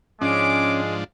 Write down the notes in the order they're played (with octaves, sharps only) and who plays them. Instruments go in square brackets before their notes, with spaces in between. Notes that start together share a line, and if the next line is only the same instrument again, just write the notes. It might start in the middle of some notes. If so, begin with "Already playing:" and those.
[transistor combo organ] G#2 F3 D4 [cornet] G#3 [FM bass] C#4 [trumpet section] D6